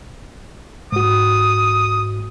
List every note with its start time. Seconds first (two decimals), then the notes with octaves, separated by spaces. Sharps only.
0.92 G#2 F#4 D#6